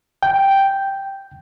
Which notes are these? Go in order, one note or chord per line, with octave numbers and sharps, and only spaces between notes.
G5